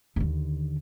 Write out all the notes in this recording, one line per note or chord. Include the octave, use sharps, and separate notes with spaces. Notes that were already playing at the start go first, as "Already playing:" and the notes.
D#2 D3